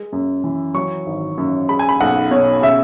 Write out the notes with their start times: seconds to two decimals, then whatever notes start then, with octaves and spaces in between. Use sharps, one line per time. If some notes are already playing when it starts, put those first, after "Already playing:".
Already playing: G#3
0.12 F#2
0.44 E3
0.74 F#3 C#6
1.06 G#1
1.38 F#2
1.69 G#3 B5
1.79 G#5
1.89 B5
2.00 B1 F#5
2.31 B2 C#5
2.62 C#3 E5